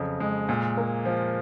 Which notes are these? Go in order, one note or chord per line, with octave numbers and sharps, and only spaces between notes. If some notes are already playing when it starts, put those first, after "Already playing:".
Already playing: F2 C#3 F#3
G#3
A#2
A#3
F3